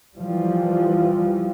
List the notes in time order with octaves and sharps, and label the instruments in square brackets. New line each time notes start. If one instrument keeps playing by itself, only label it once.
[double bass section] E3 F3 G3